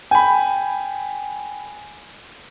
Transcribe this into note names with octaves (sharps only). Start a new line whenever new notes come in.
G5 G#5 B5